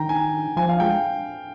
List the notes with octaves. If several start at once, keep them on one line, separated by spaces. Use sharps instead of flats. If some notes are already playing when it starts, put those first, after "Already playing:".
Already playing: D#3 G5 A#5
G#5
F3 G#5
F5
G#3 G5